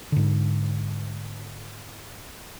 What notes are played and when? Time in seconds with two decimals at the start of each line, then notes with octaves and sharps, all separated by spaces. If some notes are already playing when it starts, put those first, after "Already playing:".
0.12 G#2 D3